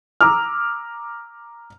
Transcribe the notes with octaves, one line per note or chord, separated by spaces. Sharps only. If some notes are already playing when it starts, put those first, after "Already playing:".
A#5 D6 E6 F6